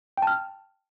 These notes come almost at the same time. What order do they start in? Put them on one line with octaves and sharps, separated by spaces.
G5 A5 F6